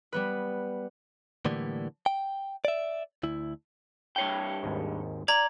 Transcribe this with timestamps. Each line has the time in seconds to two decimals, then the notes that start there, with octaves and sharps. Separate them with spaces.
0.12 G3 B3 B4
1.45 A2 D3 E3 G3 A#3
2.06 G5
2.65 D5 E5
3.23 D2 E4
4.16 G2 C#5 G5
4.63 G#1 D#2 G#2
5.28 D5 A#5 G#6